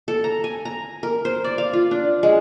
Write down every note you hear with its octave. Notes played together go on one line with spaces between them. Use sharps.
A4
A#5
G#5
A#5
A#4
C5
D5
F5
F4
D4
G#3